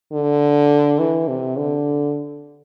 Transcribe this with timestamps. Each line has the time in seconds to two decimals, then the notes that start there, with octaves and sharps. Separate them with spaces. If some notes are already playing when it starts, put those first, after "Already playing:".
0.13 D3
0.99 E3
1.28 C3
1.57 D3